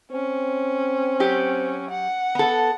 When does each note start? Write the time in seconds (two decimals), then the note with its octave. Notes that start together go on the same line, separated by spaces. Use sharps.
0.12 C4 C#4
1.20 F#3 G4
1.90 F#5
2.35 B3 A4